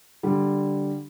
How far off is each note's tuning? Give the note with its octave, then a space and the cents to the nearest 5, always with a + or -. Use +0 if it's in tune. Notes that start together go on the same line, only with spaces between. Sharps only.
D3 +0 G3 +0